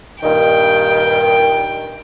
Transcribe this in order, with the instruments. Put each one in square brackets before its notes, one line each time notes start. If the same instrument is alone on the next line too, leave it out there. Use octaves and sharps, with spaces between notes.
[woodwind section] G2 A#2 D#3 [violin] G5